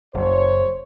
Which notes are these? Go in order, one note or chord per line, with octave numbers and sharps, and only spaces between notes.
F#1 C5 C#5